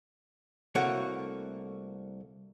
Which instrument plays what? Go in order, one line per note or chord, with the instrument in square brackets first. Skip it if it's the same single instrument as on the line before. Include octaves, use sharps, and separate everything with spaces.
[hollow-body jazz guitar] C2 A3 A#3 F#4 C#5 F#5